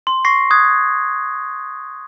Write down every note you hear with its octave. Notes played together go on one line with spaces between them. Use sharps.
C6
C#6 A#6 C7
D#6 F#6 G#6